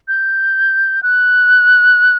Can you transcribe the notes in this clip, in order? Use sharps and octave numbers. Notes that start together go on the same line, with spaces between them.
G6
F#6